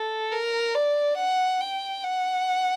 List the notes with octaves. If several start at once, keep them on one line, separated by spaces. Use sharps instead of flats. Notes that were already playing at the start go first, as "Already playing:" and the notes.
Already playing: A4
A#4
D5
F#5
G5
F#5